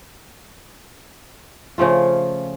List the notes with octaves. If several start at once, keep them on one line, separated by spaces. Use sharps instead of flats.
C#3 F3 A3 F4